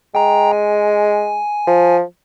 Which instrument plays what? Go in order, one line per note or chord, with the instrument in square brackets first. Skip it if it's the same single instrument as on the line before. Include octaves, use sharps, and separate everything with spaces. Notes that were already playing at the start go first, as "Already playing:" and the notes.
[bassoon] G#3 [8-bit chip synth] G5 A#5
[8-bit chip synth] G#5
[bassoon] F3